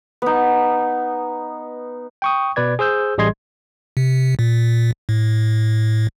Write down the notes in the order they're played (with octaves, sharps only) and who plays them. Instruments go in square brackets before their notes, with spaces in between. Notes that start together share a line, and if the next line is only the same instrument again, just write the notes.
[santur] B3 D#4
[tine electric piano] G5 C#6 D#6
B2 B4 D5 G#6
G#4 C5 E6 G6
A1 G3 G#4 D#5 C6 G#6
[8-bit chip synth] C3
A#2
A2